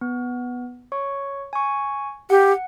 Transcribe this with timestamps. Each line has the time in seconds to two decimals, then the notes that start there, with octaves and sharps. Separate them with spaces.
0.01 B3
0.92 C#5 C#6
1.53 G#5 C#6
2.30 G4 F#5